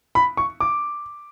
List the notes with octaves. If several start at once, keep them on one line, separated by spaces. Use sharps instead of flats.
B5
C#6
D6